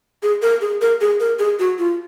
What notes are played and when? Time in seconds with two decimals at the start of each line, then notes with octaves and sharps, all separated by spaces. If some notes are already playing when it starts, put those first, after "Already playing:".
0.23 G#4
0.42 A#4
0.61 G#4
0.81 A#4
1.01 G#4
1.20 A#4
1.39 G#4
1.59 F#4
1.78 F4